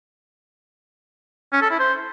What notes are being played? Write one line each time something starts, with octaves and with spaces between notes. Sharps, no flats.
C#4
A4
E4
C5